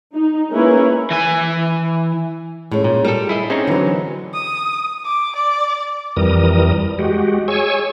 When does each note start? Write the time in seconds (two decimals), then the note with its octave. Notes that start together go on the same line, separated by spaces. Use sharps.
0.14 D#4
0.53 G#3 A#3 C#4 E4 A#4 B4
1.11 E3 G#5
2.72 A2 G#3 C#4
2.84 A#2
3.05 G3 A4 A#4
3.29 E4 G#4 D#5 E5
3.50 C4 C#4 D#4 G4 G#4
3.67 D3 E3 F#3 A#4 B4
4.34 D#6
5.05 D6
5.36 D5
6.17 F2 E3 G3 A#4 D#6
6.99 G#3 F#4 G4
7.48 G#4 C#5 G#5 C#6 E6